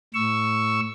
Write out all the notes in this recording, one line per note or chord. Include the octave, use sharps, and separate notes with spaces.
A2 C#6 E6